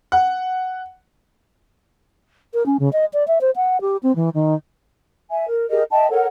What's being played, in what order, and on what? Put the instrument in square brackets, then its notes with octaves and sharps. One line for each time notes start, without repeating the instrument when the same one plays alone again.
[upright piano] F#5
[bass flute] A#4
C#4
C#3
D#5
D5
E5
C5
F#5
G4
C4
E3
D#3
[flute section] E5 G#5
A#4
G4 G#4 A#4 D#5
D#5 E5 G5 A5
A4 A#4 C#5 F#5